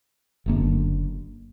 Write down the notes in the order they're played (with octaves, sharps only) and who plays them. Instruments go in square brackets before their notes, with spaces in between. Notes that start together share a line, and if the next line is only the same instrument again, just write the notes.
[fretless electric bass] F#1 F#2 D3 A#3